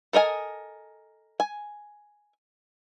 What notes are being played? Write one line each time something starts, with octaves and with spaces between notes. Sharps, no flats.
A4 A#4 D#5 G#5
G#5